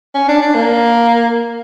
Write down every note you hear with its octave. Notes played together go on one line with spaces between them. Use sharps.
C#4
D4
D4
A#3